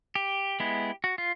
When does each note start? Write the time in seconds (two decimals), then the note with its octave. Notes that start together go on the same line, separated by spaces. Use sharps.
0.15 G4
0.60 G#3 B3 E4
1.04 F#4
1.18 F4